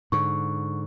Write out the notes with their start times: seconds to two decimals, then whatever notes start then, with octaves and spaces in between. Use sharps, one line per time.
0.12 G#2 D3 C#6